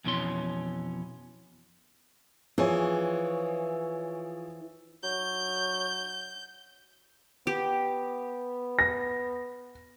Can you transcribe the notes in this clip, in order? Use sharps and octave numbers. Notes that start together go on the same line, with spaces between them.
F2 B2 E3 C#4 C6
E3 F3 G#4 C#5
F#3 G6
B3 G4
A#6